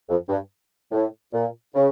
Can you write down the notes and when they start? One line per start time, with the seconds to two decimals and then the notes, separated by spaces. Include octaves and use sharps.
0.09 F2
0.29 G2
0.92 A2
1.33 A#2
1.75 C#3